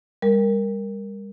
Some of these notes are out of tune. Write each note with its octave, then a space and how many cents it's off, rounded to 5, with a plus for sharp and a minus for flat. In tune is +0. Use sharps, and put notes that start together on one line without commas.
G3 +35 A#4 +0